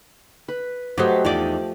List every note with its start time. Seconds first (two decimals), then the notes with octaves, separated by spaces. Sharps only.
0.48 B4
0.98 F#3 A3 G4 C5 D#5
1.25 E2 F3 D#4 D5